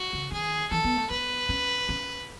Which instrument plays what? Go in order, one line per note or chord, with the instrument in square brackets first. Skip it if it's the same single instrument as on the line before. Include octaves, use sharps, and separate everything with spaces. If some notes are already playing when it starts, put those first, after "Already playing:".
Already playing: [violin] F#4
[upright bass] C#3
[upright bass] D#3 [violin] G#4
[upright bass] E3 [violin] A4
[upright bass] B3
A3
[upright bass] B3 [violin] B4
[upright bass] C#4
C#4